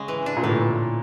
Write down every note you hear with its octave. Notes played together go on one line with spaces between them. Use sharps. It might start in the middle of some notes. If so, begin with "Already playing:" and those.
Already playing: C#3 G#3
E3
D4
A#2
A2 E3